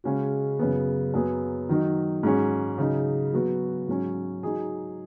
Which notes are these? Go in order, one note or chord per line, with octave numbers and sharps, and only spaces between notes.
C#3 G#3 C#4 F#4
F#2 C#3 B3
F#2 F#3 B3 G#4
D#3 F#3 D#4
G#2 F#3 C#4 G#4
C#3 F#3 D#4
F#3 B3 F#4
G#2 F#3 C#4
F#3 D#4 G#4